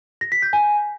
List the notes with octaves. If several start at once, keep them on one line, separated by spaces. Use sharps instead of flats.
A#6
B6
G6
G#5